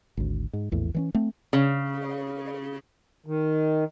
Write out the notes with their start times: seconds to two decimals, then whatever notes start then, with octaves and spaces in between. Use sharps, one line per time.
0.17 G#1 D2
0.53 G#2
0.71 A#1 E2 A2
0.94 E3 G3 C#4
1.15 A3 C4
1.53 C#3
3.26 D#3